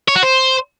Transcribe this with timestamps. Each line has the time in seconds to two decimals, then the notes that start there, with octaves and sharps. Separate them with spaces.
0.08 C#5
0.15 F#4
0.23 C5